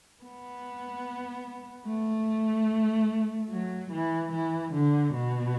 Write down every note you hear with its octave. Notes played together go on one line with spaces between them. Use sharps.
B3
A3
F#3
E3
E3
D3
B2